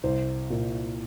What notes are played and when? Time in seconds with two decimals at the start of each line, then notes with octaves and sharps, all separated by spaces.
0.04 C2 C5
0.50 A#2